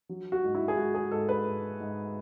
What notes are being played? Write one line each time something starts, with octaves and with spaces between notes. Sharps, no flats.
F#3
F#4
G#2
E4
G#4
G#2 F#4
G#4
G#2 A4
B4
G#2
G#2